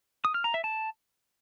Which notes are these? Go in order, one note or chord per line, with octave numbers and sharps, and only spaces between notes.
D#6
F6
A#5
E5
A5